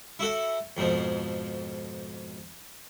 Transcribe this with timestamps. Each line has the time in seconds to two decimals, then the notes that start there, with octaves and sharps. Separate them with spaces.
0.19 E4 F#4 A4 F#5
0.77 F2 G#2 B2 F3